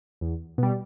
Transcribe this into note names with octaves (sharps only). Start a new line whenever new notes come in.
E2
B2 G3